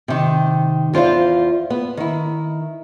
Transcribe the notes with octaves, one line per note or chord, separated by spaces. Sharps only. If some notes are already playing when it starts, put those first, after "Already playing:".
C3 D#3
E2 F4 C5 D5 F5
B3
D#3 E4